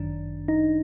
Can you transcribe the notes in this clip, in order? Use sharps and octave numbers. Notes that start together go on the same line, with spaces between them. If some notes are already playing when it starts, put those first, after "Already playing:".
Already playing: G1 F#2 D#3 D4
D#4